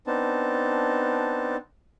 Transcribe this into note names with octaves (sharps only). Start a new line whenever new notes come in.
B3 C4 D4 D#4 A5